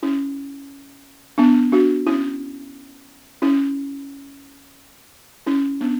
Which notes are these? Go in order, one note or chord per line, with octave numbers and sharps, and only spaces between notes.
C#4 E4
B3 D4
D4 F#4
C#4 E4
C#4 E4
C#4 E4
B3 D4